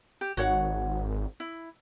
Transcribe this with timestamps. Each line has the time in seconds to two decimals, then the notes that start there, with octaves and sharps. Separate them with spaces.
0.21 G4
0.37 G#1 F#4 C#5 F#5
1.40 E4